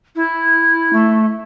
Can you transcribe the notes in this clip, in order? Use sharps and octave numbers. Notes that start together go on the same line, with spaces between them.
E4
A3